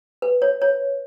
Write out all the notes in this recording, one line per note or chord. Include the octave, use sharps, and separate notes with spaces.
B4
C#5
C#5